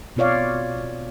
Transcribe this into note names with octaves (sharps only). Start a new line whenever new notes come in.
B2 C4 F4 C#5 D5 F5